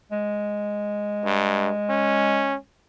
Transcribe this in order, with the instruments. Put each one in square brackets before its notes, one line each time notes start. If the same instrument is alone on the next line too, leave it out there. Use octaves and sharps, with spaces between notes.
[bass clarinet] G#3
[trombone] G2
C#4